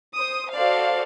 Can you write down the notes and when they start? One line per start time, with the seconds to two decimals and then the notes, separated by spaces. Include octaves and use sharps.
0.13 C5 D#6
0.52 F#4 A4 C5 D5 F5